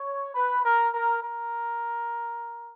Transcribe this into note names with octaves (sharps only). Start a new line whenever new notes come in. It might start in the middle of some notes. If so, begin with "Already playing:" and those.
Already playing: C#5
B4
A#4
A#4
A#4